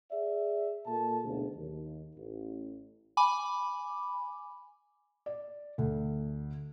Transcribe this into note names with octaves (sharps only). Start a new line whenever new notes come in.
G#4 D5 E5
A#2 A#3 A4 A5
F#1 D2 B2 D4 G#4
D#2
A1
G#5 B5 D6
D5
D2